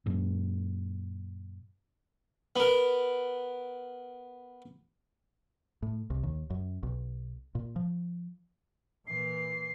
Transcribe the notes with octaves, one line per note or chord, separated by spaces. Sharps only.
F#2 A#2
B3 A#4
A2
C2
D#2
F#2
B1
A#2
F3
A#2 E3 C7